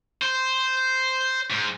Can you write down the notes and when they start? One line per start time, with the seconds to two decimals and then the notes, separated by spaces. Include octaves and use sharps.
0.22 C5
1.50 G#2